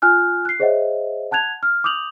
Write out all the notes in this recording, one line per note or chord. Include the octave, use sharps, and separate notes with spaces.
F4 G#5 F6 F#6
F#6 C7
G#4 C5 C#5 D#5 E5 F#5
F#5 A5 F#6 G#6 F7
F6
D6 D#6 G6 F7 F#7